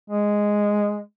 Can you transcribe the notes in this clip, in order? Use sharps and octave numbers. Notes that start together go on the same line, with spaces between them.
G#3